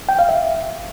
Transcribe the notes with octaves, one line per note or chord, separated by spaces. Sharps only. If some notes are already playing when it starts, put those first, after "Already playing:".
G5
F5
E5